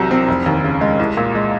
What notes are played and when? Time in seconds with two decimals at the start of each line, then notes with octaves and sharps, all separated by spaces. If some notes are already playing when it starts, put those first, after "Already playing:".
Already playing: C2 C3 F#3
0.11 C4
0.28 F1
0.46 D#2
0.64 C#3
0.81 G#3
0.99 C2
1.17 A#2
1.35 G#3